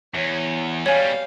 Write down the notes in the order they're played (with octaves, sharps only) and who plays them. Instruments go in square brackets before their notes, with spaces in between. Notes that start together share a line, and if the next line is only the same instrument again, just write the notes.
[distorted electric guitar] E2 [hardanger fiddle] C#5
[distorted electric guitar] B2 G3 [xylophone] C#5 G#5 [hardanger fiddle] F5